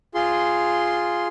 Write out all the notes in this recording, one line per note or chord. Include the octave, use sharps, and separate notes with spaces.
F4 G#4 C6